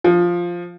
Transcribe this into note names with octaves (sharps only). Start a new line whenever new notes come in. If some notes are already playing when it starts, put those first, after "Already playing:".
F3